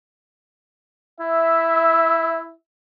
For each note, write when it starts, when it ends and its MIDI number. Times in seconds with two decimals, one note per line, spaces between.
1.20 2.53 64
1.20 2.53 76